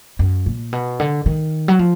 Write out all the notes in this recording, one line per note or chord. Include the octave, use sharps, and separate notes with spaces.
F#2
A#2
B2
D3
D#3
F#3
F3